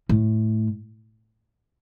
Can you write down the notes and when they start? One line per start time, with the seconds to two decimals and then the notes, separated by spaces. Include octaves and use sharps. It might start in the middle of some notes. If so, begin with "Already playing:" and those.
0.09 A2